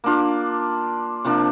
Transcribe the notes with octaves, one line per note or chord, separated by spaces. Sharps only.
A#3 D4 F4
C3 F3 A#3 D4